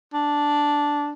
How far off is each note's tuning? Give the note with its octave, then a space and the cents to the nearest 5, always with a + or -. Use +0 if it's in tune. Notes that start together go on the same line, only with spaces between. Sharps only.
D4 -5